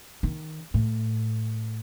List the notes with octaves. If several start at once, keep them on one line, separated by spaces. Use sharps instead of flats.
D#3
A2